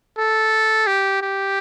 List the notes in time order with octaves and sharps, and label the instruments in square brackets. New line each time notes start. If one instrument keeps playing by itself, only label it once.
[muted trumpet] A4
G4
G4